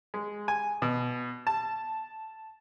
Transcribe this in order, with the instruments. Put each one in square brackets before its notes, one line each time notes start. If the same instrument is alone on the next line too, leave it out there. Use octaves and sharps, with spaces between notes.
[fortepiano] G#3
G#5
B2
A5